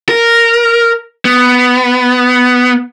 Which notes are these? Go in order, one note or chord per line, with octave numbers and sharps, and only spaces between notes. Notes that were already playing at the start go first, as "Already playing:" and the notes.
A#4
B3